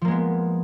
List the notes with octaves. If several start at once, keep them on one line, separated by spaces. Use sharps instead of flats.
F3 G#3 A#3 B3